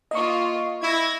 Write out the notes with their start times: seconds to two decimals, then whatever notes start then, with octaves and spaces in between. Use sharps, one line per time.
0.11 A#3 F4 D#5 C#6
0.82 E4 G#6 A#6